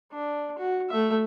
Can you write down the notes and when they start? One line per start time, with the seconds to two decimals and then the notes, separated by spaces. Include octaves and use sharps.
0.12 D4
0.58 F#4
0.90 A3 E5